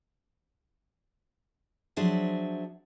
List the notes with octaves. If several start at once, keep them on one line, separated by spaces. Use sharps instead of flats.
F3 F#3 D4 G#4 C5 E5